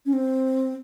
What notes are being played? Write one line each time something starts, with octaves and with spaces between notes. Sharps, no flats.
C#4
C4